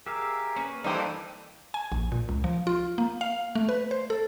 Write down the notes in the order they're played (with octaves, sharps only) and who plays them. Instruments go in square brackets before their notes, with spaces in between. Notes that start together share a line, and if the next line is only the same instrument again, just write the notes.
[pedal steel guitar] G4 E5 F5 [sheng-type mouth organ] G#4 A#4
[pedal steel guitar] A#3 B4 [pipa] C#4
[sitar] G2 E3 [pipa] D#4 G4 [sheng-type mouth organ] A4 C5 F5
[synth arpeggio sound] G#5
A#1
A#2
C#2
F3
F4
A#3
F5
A3
B4
C5
A4